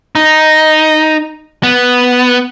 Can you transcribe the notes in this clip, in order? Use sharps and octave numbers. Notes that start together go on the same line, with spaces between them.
D#4
B3